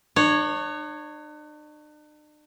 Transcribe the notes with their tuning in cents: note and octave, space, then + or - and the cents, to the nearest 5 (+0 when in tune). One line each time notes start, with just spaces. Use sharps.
D4 +45 C#5 +0